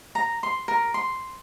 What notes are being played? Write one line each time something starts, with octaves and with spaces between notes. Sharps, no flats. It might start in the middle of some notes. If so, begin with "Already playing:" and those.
A#5
C6
A#4
C6